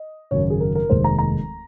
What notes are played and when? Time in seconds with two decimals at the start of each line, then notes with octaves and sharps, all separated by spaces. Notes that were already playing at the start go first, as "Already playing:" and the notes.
Already playing: D#5
0.31 G#1 F#2 C#3 C#5
0.50 G#4
0.61 A#4
0.75 A#4
0.90 F1 D#2 D#3 G#3 C5
1.04 A#5
1.19 A#5